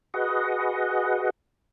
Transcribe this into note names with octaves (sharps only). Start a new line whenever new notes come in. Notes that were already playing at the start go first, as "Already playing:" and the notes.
F#4 G#4 B4 D#5 F#5